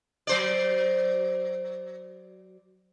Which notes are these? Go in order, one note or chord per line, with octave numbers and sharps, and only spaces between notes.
F#3 C5 D5